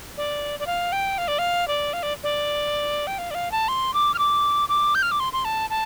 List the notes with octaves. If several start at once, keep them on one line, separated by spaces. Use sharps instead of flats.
D5
D5
F5
G5
F5
D5
F5
D5
F5
D5
D5
G5
F5
D5
F5
A5
C6
D6
F6
D6
D6
G6
F6
D6
C6
C6
A5
A5